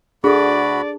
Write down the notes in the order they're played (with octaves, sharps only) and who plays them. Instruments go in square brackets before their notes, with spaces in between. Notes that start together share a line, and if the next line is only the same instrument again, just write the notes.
[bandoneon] D2 F#4 B5 [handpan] D4 [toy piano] G#4 A4 [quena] D5